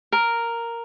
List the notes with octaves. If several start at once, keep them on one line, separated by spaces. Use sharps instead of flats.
A#4